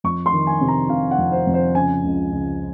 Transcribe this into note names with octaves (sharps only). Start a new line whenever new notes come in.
F2 C#6
C6
D#3
G#5
C3
A#5
C3 F5
F#5
F2
C5
F2
C5
C#3 G#5
C#2
C#2